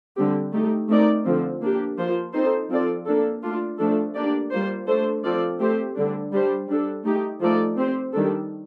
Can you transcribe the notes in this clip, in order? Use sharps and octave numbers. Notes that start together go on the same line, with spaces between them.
D3 G3 C4 G4
A3 D#4 G4
A3 C4 D#4 A#4 D5
D3 F3 C4
A#3 D4 G4
F3 A#3 F4 C5
C4 D#4 A4 C5
F3 C4 F4 A4 D5
A#3 D4 A4
A3 D4 F4
F3 A3 D4 A4
A#3 D4 G4 D5
G3 A#3 F4 C5
A3 D4 A4 C5
F3 C4 F4 A4 D5
A3 C4 G4 C5
D3 G3 D4
G3 D4 G4 C5
G3 D4 A4
A3 D#4 G4
F3 A3 D#4 A4 D5
C4 G4 C5
D#3 G3 D4 A4